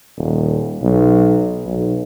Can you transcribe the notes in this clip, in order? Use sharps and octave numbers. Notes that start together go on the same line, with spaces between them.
D#1
B1
B1